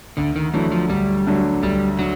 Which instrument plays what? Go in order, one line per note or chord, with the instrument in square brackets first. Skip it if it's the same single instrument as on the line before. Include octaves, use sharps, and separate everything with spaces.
[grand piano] D2 [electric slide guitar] D3
[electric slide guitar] D#3
[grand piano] D3 F#3 A3 [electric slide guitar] E3
[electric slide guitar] F3
[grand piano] D2 [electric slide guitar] G3
[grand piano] D3 F#3 A3
[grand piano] D2 [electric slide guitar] G3
[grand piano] D3 [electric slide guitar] F#3